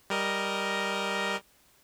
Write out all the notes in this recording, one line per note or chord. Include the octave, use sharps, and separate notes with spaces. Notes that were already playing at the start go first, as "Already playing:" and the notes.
G3 A#4 D#5